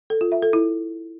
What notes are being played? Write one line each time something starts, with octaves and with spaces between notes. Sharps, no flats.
A4
F4
E5
A4
E4